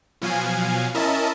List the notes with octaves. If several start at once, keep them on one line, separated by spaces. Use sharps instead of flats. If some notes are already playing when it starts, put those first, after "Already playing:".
B2 F3 F#3 F5 G#5
C#4 E4 A#4 D#5 E5 A5